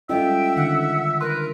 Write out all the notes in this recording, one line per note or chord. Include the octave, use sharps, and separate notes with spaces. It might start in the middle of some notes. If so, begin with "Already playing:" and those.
G3 G#3 C#4 F4 A4 D#5 E5 G5
D3 D#3 F#5
A#4 B4 C6